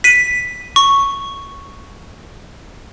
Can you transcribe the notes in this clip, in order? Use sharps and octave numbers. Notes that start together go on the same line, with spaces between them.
B6 D#7
C#6